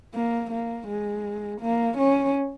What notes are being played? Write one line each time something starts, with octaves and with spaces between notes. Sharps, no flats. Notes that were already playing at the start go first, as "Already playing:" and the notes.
A#3
A#3
G#3
A#3
C#4